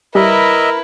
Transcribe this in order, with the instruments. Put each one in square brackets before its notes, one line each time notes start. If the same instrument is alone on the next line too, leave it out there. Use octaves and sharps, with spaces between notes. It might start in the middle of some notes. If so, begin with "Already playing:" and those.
[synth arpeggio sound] G3 [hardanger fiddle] E4 B4 [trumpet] A#4 [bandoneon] D#5 E5